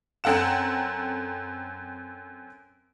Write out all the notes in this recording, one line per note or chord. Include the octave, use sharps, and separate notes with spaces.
F#2 C4 A4 F#5 E7